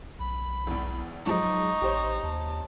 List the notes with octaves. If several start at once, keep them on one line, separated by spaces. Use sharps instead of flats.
B1 B5
G#1 E2
G#2 F3 F#3 G#3 D#4 C#6
A1 G4 C5 C#5
D#2 A5